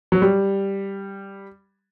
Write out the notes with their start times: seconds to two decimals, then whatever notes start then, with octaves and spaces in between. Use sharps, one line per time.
0.12 F#3
0.22 G3